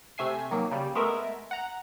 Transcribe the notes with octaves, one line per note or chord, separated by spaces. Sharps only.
C3 A3 E5 G#5 C7
D#3 F#3 A#3
C#3 G3
G#3 A3 B3 A#4 E5
F#5 A#5